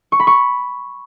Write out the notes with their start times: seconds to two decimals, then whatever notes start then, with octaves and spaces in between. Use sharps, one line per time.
0.12 C#6
0.20 B5
0.27 C#6